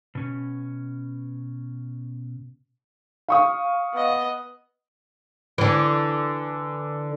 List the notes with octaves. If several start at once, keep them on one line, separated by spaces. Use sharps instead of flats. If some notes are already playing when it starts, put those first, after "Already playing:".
B2 C#4
F5 C#6 D#6
B3 D#5
D3 E3